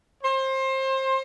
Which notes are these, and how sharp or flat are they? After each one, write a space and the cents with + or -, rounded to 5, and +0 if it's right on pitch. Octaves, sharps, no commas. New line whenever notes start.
C5 +25